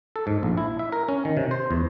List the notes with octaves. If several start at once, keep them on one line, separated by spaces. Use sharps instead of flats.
A4
G#2
A#1
E4
E5
A#4
C#4
D#3
C3
C5
E2